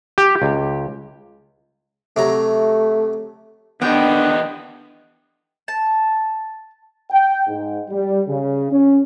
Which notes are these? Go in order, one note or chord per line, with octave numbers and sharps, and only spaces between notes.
G4
C#2
C3 F#3 A3 A#5
E2 D3 D#3 B3 D4 G4 D#5 G5
A5
G5
G#2
G3
C#3
C#4